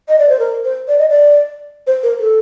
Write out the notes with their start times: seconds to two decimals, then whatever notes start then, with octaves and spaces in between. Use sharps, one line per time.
0.09 D#5
0.19 D5
0.29 C5
0.39 A#4
0.64 C5
0.88 D5
0.99 D#5
1.09 D5
1.87 C5
2.03 A#4
2.20 A4